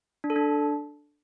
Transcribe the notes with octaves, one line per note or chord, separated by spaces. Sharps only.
D4
A4
D4